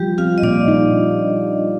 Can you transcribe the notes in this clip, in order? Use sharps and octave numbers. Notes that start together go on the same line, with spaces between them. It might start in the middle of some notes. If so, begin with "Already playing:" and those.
Already playing: F3 G3 G4
C4 F4 F5
D#5
A#2 D4 D5
D#4